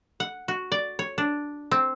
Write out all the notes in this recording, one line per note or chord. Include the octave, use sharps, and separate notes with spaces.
F#5
F#4
D5
C#5
D4
C4